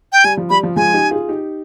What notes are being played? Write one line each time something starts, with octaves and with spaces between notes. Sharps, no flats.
G5
G3 G#5
F3
G3 B5
F3
F3 G#3 G#5
D#4 G4
F4 G#4
D#4 G4